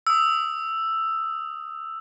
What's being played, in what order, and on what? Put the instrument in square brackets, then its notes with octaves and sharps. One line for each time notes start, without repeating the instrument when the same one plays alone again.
[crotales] D#6 E6